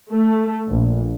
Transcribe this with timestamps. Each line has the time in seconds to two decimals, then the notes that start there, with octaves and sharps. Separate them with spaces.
0.12 A3
0.69 A#1